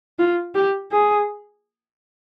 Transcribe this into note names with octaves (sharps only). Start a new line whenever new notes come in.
F4
G4
G#4